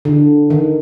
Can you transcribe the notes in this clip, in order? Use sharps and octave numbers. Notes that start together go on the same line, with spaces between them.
D3
D#3